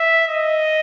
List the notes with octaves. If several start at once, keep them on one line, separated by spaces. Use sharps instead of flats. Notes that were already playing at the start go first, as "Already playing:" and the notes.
Already playing: E5
D#5